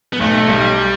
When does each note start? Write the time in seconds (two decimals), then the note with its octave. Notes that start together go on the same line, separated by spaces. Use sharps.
0.13 B3
0.20 B1 A3
0.48 B1 G3